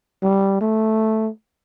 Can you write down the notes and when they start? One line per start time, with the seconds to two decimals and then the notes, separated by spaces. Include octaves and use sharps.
0.23 G3
0.61 A3